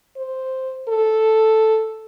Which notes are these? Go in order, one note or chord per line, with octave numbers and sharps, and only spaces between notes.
C5
A4